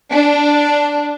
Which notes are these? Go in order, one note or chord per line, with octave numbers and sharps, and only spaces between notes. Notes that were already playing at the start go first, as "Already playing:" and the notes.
D4